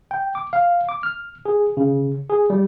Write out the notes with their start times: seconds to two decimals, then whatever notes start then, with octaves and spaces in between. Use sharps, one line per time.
0.11 G5
0.35 D6
0.53 F5
0.89 D6
1.03 F6
1.45 G#4
1.77 C#3
2.29 G#4
2.50 G3